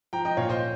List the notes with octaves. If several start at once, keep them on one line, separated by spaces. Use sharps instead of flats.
F3 G5 A#5
D#5 G5
A#2 C#5 F5
C5 D#5